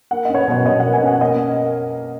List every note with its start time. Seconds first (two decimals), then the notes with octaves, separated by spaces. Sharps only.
0.11 A#3 F#5
0.25 C#4 D#5
0.35 C#5
0.38 B4
0.48 B2 C#5
0.66 B2 D#5
0.80 A#3 F#5
0.93 G#5
1.02 C#4
1.08 F#5
1.21 A#3 D#5